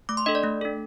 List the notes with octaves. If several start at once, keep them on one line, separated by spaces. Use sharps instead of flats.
A3 D6
C6
D4 A4 D#5
D5
A3
D4 A4